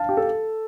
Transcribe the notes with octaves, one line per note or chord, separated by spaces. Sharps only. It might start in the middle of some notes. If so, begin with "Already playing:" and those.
Already playing: F5 A5
G4
A4